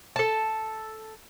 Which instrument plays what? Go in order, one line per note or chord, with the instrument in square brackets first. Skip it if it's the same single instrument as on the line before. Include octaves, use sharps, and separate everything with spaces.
[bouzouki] A4 A5